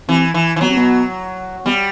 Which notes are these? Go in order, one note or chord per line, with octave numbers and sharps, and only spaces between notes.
C3 E3
E3
E3
B2 F#3
C3
B2
B2 G3